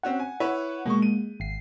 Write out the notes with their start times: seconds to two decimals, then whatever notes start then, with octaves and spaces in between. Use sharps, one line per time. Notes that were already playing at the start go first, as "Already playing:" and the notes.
0.03 C4 C#4 F#4 F#5
0.19 G#5
0.40 E4 B4 C#5
0.86 B2 G#3 A#3 C#6
1.02 D#7
1.40 G#1 C7